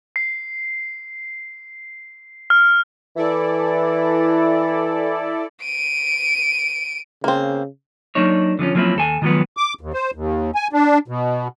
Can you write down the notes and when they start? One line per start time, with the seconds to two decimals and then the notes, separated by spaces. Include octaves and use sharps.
0.16 C7
2.50 F6
3.16 E3 E4 A4 D5
5.62 D7 D#7
7.24 C#3 A#3 C4
8.15 F#3 A#3 D4 D#4 C#5
8.59 D3 F3 G3 C#4
8.75 F3 F#3 A#3 C4 C#4 E4
8.96 D#2 A4 G#5
9.22 D#3 F3 F#3 G#3 B3
9.57 D6
9.81 D#2
9.93 C5
10.15 D#2
10.55 G#5
10.73 D4
11.08 B2